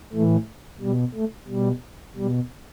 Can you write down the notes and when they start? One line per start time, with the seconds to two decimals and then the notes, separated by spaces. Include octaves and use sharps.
0.13 A2 E3 A3
0.81 B2 G3
1.14 A3
1.48 B2 G3
2.16 B2 G3